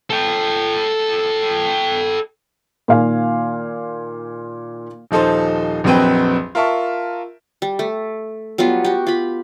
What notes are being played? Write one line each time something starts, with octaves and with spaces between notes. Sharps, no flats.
A4 G5
A#2 D#3 F5 G#5
D#1 F3 D#4 A4 C5
A#1 F2 F#3 C4 B4 G5
F4 A#4 E5 A5 C#6
G3
A3
F#3 G3 B3 F4
F#4 G4
F4 B5